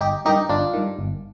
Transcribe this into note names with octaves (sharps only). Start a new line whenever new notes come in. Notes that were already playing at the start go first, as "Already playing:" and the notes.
G1 D#4 G4
G2 D#3 D#4 G4
G1 D4 F4
G2 D#3
G1